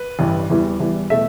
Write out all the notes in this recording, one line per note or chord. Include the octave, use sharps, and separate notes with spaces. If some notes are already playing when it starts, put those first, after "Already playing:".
Already playing: B4
A1 G2 E3 G3
E2 E3 G3
E2 E3 G3
B2 A3 E5